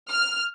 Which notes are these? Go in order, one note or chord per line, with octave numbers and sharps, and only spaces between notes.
F6